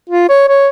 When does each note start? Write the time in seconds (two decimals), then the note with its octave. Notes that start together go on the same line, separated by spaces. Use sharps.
0.10 F4
0.29 C#5
0.48 C#5